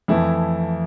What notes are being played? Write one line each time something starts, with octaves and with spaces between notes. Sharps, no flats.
F2 E3 A3 E4